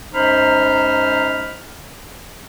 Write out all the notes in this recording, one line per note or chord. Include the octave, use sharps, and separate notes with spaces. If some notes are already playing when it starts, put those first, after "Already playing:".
F#2 G#3 D#4 C5 B5 F6